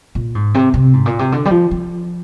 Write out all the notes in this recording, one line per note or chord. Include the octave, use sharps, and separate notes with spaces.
A#2
G#2
C3
C3
G#2
A#2
C3
D3
G3
F3
F3